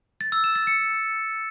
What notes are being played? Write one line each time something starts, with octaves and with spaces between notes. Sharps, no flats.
A6
E6
E7
A6
C#7